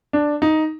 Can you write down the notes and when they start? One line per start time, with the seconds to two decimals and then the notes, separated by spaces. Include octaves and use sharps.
0.13 D4
0.42 D#4